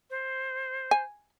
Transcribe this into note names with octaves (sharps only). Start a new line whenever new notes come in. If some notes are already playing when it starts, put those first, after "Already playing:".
C5
G#5